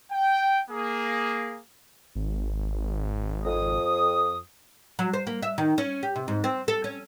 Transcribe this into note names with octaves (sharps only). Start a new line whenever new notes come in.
G5
A#3 G#4
G#1
F2 D#6
F#3
C5
A#3
E5
D#3
C#4
G4
C3
G#2
C4
A4
C#4